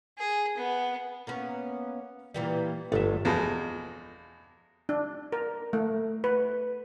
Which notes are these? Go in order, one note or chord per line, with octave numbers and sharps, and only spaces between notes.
G#4
B3
A#3 B3 C#4
A#2 E3 G3
G1 G#2 F#3 A3 E5
E2 B2 F3 G#3
D4
A#4
A3
B4